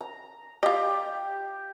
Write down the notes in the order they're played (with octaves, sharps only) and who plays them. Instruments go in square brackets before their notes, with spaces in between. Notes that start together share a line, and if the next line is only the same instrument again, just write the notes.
[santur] A#5
[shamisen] F4 D#5 [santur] G4